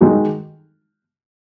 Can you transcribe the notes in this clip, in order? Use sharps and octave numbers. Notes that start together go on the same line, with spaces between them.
D#3 G#3 D#4 F#4